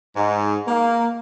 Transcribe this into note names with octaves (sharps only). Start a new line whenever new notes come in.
G#2
A#3